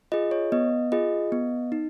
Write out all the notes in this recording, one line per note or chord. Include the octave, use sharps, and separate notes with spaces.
F4 G#4 D#5
C#5
B3 D#5
F4 G#4 D#5
B3
D#4